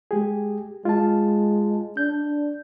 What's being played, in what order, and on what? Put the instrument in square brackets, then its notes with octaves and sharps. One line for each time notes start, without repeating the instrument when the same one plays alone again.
[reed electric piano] G#3 G4 G#4
[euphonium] G#3 [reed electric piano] F4 A5
[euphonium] D4 [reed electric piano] G6